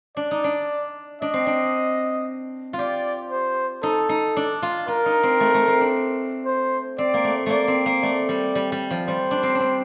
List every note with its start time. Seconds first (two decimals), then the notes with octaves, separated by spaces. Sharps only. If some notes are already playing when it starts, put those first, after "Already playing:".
0.17 D4 D5
0.31 D#4
0.44 D4
1.22 D4 D#5
1.33 C4
1.46 D4
2.73 F4
2.79 G4 D5
3.31 C5
3.83 D#4 A4
4.09 D#4
4.36 D4
4.62 F4
4.88 F4 A#4
5.06 D#4
5.23 C4
5.40 A3
5.54 A3
5.68 C4
5.81 D4
6.46 C5
6.98 C4 D5
7.14 A#3
7.24 A3
7.46 A3 A#3 D5
7.68 C4
7.86 A#3
8.02 A3 D5
8.29 G3
8.55 G3
8.72 G3
8.91 F3
9.08 G3 C5
9.31 D4
9.43 C4
9.55 D4
9.60 C4